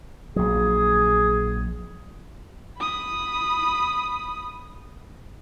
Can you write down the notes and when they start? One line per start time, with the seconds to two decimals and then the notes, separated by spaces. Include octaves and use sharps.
0.36 A#1 F#3 G#4
2.78 B5 D#6